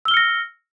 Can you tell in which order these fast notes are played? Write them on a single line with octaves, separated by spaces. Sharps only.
E6 G7 F6 C#7 A#6